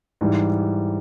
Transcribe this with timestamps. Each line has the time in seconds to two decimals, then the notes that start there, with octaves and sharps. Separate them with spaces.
0.21 G#2 E3 G3